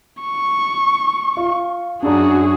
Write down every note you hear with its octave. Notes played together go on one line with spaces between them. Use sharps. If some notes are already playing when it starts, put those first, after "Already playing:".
C#6
F4
F#2 D4 F#4 G#4